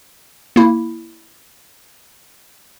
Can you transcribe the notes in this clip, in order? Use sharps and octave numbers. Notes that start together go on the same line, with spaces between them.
A#3 E4